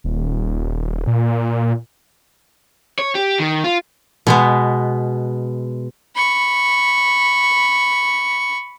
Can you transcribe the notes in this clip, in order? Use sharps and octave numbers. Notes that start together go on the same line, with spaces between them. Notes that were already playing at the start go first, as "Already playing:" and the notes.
D#1
A#2
C#5
G4
D#3
F4
B2 G#3 B3
B5 C#6